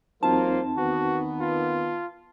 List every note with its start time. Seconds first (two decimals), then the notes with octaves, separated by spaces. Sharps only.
0.23 E2 F#3 A#3 C4 D#4 F4 C5 A5
0.77 D#3 B3 F#4
1.40 F4